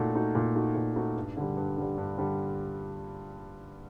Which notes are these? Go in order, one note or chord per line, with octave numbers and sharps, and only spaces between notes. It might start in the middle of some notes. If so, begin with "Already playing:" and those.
Already playing: A#2 A3 D#4 F#4
A3 D#4 F#4
A#2
A3 D#4 F#4
A#2
A3 D#4 F#4
G2
D3 G3
G2
D3 G3
G2
D3 G3